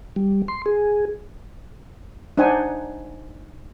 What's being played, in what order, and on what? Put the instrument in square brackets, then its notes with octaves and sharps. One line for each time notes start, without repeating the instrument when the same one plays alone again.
[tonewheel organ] G3
C6
G#4
[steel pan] D4 D#4 C5 F#5 G#5